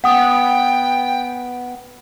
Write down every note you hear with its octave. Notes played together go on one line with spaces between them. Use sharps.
B3 F#5 G5 D#6